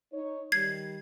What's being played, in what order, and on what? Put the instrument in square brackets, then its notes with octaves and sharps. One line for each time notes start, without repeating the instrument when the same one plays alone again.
[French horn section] D#4 C#5
[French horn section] D#3 G3 [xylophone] G#6 C7